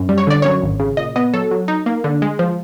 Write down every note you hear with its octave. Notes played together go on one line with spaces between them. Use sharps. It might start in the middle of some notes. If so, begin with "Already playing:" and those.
Already playing: F#2
G3
C#5
D3 D5
F#2 C#5
G#1
C#3
A#2 D#5
B3 D#5
F#3 A4
F#3
D#4
A#3
D3
G#3
F3